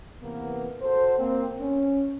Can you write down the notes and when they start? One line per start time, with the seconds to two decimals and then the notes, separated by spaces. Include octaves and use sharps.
0.23 C3 E3 A#3 B3
0.82 F#4 A4 C5
1.18 A#3 C4
1.60 C#4